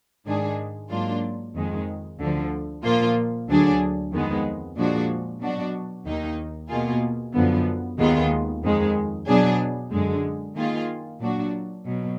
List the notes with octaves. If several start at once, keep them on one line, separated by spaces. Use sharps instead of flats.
G#2 D#3 G#3 D4 G#4
G#2 F#3 A#3 D4 F4
F2 D#3 G#3
D2 D3 F3
A#2 F3 A#3 F4
D2 D3 F#3 D4 G#4
F2 D#3 G#3 B3
A#2 F3 G#3 D4 F#4
B2 F#3 D4 F#4
D#2 D#3 A#3 D#4
B2 A#3 F4 G#4
F#2 D3 F3 B3
D#2 D#3 G#3 B3 F4
F2 D#3 G#3
B2 F#3 B3 D4 G#4
F#2 D3 G#3
D#3 A#3 F4 G#4
A#2 F#3 D4 F#4
B2 F#3